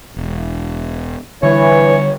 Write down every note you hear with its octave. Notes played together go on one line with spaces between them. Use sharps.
E1
D3 E3 G3 C#5